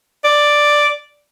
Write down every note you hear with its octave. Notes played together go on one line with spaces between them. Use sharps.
D5